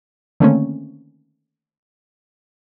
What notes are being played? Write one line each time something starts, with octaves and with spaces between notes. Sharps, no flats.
D3 D#3 A3 A#3 C4 C#4